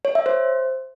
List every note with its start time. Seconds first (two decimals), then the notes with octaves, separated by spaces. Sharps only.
0.05 C#5
0.15 E5
0.26 C5